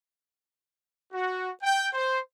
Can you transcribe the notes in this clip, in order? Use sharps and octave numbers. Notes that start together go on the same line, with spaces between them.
F#4
G5
C5